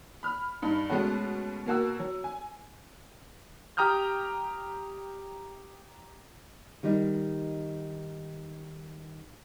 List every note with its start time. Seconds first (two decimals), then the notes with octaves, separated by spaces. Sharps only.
0.23 B5 F6
0.62 G2 D#4
0.90 B2 G#3 A3 B3 C#4 F#4
1.66 B2 A#3 F#4 E6
1.99 F#3
2.24 G#5
3.77 G4 G5 A#5 D#6 F6 G6
6.83 D#3 G3 D#4